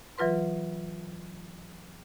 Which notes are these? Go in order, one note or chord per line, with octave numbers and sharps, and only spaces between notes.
E3 F#3 F4 B4 C6